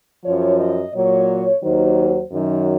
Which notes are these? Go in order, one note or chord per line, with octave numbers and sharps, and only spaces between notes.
F#2 F3 C#5
D#5
A#2 F#3 C#5
D#2 D#3 F#3 C5
F#2 D#3 F#3